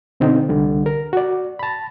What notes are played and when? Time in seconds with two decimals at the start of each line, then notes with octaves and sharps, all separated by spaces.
0.20 B2 D3 C4 D#4
0.49 C2 D3 G3
0.86 A#4
1.13 F#4 D5
1.59 A5 B5